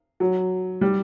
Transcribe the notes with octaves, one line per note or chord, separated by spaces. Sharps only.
F#3
G3